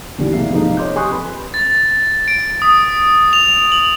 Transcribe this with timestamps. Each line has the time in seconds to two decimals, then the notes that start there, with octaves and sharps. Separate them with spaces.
0.18 D#2 A#2 D3 E3 G3
0.32 C2 G#2 B2 A#3 E5 C7
0.52 F2 G#2 C3 F3 A#3 D#4
0.77 C#5 D#5 C6 D6 G6
0.96 G4 G#5 C6 C#6 D#6 F#6
1.10 F2 B4 B5
1.54 A6
2.28 D7
2.62 D#6
3.33 F7
3.72 F#7